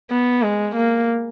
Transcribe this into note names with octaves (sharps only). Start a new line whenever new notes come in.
B3
G#3
A#3